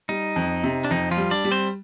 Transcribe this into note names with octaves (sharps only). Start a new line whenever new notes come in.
G3 D#4
F2
C3
D4
F2 D#4
F3 F4
G3
D4 D5
G3
C4 C5